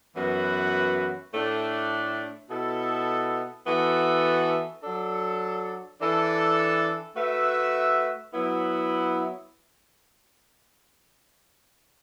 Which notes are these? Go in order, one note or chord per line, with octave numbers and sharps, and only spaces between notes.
F#2 E3 B3 F#4 B4
A2 A3 D4
B2 B3 E4 A4
E3 B3 F#4 A4 E5
F#3 D4 A4
E3 D4 A4
A3 F#4 B4 E5
F#3 B3 E4